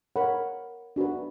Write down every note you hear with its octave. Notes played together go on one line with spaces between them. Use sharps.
A#4 C#5 F#5 B5
D4 F#4 B4